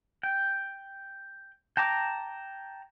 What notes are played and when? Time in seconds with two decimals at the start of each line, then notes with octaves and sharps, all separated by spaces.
0.23 G5
1.77 G5 A5 A#5 D6